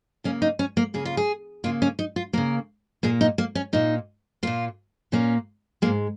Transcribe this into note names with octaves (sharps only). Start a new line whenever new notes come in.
C#3 A#3 C#4
D#4
C#4
A#3
C#3 A#3 G#4
F4
G#4
C#3 A#3 F4
C#4
D#4
F4
C#3 A#3 A#4
A#2 A#3 G#4
D#4
A#3
C#4
A#2 A#3 D#4
A#2 A#3 F4
A#2 A#3 C#4
G#2 G#3 A#3